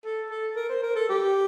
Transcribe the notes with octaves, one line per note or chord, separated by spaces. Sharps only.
A4
A4
A#4
C5
A#4
A4
G4